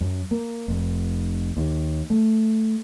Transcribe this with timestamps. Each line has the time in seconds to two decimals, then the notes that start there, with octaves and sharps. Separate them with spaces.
0.01 F#2
0.31 A#3
0.68 F1
1.57 D#2
2.10 A3